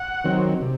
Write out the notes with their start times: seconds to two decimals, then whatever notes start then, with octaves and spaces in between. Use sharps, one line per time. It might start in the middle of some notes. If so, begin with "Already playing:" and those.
Already playing: F#5
0.24 D#3 F#3 C4
0.62 C3